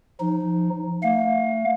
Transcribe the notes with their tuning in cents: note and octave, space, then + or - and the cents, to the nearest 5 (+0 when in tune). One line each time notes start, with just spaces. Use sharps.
F3 +0 D#4 +0
A3 +25 F5 +35